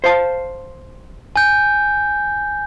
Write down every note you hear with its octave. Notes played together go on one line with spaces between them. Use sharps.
C5 F5 A5
G#5 G6